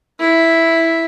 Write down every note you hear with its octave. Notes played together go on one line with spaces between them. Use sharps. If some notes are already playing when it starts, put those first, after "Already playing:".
E4